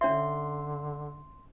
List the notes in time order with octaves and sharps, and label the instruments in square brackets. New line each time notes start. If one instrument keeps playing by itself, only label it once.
[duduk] D3 [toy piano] C#4 C#5 E5 [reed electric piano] C6